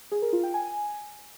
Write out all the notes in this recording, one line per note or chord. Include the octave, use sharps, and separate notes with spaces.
G#4
A#4
F4
G5
G#5